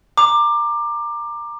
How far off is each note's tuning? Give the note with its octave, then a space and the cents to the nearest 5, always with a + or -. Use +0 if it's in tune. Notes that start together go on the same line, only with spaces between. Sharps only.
A#5 +0 D6 +20